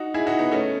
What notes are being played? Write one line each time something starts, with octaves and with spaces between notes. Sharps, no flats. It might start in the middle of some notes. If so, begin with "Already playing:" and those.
Already playing: D#4 F#4
E4 G#4
D#4 F#4
B3 D#4
A3 C#4